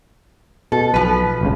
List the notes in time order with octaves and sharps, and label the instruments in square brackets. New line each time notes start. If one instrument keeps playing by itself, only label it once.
[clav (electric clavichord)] B2 [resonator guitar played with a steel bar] A4
[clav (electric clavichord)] B1 [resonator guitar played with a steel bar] F3 B4
[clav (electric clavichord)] G1 C#2 C#3